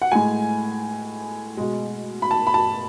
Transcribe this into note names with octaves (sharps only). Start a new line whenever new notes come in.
F#5
A2 G#3 G#5
B2 G#3
B5
A5
B5
A5